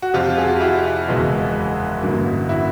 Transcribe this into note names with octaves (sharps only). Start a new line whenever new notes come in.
F#4
F2 C3 F3 F4 G4
F#4 G#4
G4
E4 F#4
F#1 E2 B2 G#3
A1 G2 D3 F#3 A#3
E4 F#4